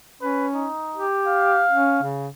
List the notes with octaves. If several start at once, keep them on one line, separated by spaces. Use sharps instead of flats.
C#4 B4
D#4
G4
F5
C#4
C#3